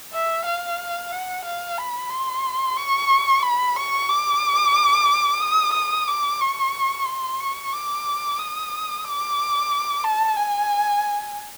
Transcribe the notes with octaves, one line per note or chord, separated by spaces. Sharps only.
E5
F5
F#5
F5
B5
C6
C#6
B5
C#6
D6
D#6
D#6
D6
C#6
C6
C#6
D6
D#6
D6
A5
G#5